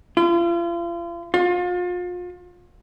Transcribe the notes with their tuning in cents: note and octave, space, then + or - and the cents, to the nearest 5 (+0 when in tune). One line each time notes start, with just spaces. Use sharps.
F4 -40
F4 +35